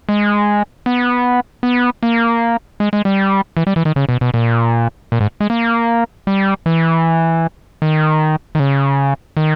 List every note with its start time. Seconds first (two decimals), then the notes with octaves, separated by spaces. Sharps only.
0.09 G#3
0.86 B3
1.63 B3
2.03 A#3
2.80 G#3
2.93 G#3
3.05 G3
3.57 E3
3.67 G3
3.76 E3
3.85 D#3
3.96 C#3
4.09 B2
4.21 B2
4.34 A#2
5.12 A#2
5.21 G#2
5.40 G#3
5.50 A#3
6.27 G3
6.66 E3
7.82 D#3
8.55 D#3
8.60 C#3
9.37 D#3